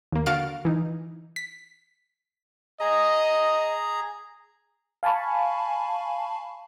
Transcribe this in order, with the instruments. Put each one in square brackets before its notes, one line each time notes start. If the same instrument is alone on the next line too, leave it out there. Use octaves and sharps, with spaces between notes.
[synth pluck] D#2 A#3
D3 F#4 F5 F6 A6 D7
E3 D#4
B6
[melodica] G#4 A#5 [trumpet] D#5
[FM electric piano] F5 G#5 A5 B5 C#6